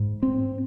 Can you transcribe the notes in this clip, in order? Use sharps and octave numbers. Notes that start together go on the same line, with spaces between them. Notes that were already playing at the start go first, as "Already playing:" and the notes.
Already playing: G#2
C4